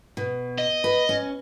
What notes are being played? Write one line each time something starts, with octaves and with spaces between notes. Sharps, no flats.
B2
D#5
B4
C#4